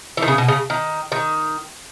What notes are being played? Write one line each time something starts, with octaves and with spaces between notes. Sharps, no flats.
E3
D#3
C#3
B2
C#3
D#3
D#3